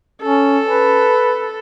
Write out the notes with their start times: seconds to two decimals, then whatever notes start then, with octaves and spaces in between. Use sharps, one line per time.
0.22 C#4 A4
0.66 B4